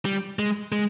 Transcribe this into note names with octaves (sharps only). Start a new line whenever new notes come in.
G3
G#3
G#3